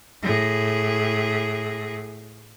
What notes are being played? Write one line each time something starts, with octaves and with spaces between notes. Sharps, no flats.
A2 G#4